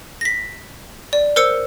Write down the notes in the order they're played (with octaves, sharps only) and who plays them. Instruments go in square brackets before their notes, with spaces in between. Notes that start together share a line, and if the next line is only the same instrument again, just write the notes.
[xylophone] A#6 B6
D5
A#4 C5 E6 C#7